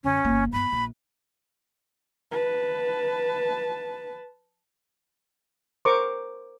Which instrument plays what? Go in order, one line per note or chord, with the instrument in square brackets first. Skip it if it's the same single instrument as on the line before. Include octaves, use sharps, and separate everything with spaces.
[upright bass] F#2 D3 [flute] C#4
[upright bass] G1 A#3
[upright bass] G2 B3 [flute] B5
[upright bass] A#1
[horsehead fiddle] B4 A5
[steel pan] A#4 C5 A#5 C#6 D6